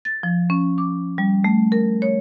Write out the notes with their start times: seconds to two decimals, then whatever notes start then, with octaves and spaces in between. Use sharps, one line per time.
0.05 A6
0.23 F3
0.50 C#4
0.78 D6
1.18 G3
1.44 A3
1.72 A#4
2.02 C#5